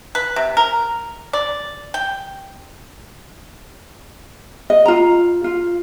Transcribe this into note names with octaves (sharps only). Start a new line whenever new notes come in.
B4
C3
A#4
D5
G5
D#5
F4 A#5
F4